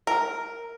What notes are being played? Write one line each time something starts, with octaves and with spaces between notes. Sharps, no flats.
A#4